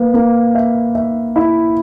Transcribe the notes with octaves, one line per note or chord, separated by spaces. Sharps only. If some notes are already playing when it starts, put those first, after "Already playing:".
Already playing: A#3 B4
A#3
E5
E5
E4